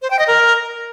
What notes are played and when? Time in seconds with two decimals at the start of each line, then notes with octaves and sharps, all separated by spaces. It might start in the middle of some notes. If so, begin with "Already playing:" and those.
0.02 C5
0.10 G5
0.19 D#5
0.27 A#4